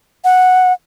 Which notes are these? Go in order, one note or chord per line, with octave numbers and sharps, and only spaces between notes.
F#5